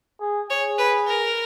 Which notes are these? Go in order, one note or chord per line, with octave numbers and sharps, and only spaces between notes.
G#4
G#4 C#5
B4
A#4